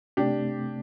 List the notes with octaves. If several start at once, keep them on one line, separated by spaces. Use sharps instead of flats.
C3 A3 C4 D4 G4